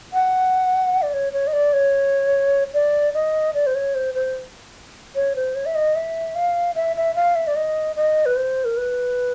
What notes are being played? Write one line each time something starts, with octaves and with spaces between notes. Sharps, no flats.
F#5
D5
C#5
C#5
D#5
D5
C#5
D5
D#5
D5
C5
C#5
C5
C5
C#5
C5
C#5
E5
D#5
E5
F5
E5
E5
F5
E5
D5
D#5
D#5
B4
C5
A#4
B4